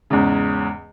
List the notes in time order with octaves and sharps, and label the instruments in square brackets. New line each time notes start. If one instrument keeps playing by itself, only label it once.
[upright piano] E2 G#2 C#3